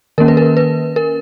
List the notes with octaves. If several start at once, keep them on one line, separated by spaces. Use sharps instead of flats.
D#3 A#3 C#4 A#4
B4
A#4
B4
A#4